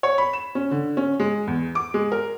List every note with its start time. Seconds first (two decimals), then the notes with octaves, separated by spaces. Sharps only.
0.03 C#5
0.18 B5
0.33 E7
0.55 C#4
0.71 D3
0.97 C#4
1.20 G#3
1.47 E2
1.75 D6
1.94 G#3
2.12 A#4